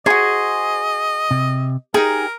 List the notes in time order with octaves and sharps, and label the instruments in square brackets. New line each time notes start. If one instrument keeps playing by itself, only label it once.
[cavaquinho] D#4 F#4 [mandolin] G#4 [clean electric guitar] C5 [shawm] D#5
[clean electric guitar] C3
[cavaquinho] D#4 G#4 [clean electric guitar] G4 G5 [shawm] A#4